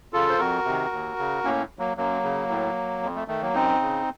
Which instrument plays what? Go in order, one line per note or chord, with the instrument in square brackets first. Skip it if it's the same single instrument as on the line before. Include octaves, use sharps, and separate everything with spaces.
[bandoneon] C#3 F4 A4
C5
F2 F#4 A#4
C3 D#3
D#2
C#3
A2 A#3 C#4
F#3 A#3
F#2 F#3 A#3
C#3
A2
F2
A3
D#3 A3
F#3 A#3
F#2 C4 D#4
C#3